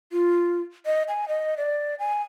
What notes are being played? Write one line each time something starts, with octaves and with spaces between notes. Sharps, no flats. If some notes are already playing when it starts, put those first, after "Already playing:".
F4
D#5
G#5
D#5
D5
G#5